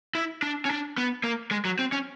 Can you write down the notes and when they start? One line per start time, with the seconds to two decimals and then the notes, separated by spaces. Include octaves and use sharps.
0.15 E4
0.43 D4
0.65 C#4
0.70 D4
0.98 B3
1.24 A#3
1.51 G#3
1.65 F#3
1.79 C4
1.92 C#4